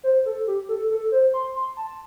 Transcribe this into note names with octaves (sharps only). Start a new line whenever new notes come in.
C5
A4
G4
A4
A4
C5
C6
C6
A5